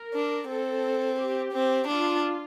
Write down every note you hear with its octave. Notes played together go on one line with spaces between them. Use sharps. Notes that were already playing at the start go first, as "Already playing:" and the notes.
Already playing: A#4
D4
C4 A4
G4
C4
D4 F4